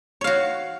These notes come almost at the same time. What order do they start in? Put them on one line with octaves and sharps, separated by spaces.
C#5 F5 F#4